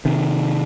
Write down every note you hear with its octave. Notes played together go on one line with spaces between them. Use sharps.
C3 D#3